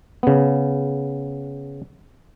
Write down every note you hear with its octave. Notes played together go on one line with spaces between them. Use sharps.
C#3 B3